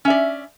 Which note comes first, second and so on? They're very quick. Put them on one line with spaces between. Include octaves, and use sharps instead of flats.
C#4 E5 D5